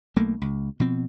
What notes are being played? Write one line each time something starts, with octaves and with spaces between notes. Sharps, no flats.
B1 A3 A#3
C#2
B2 F3 C4